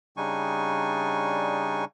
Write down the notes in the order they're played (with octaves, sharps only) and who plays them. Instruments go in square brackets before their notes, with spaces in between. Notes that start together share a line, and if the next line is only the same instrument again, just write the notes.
[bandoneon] C#3 G3 D4 D#4 G#5 C#6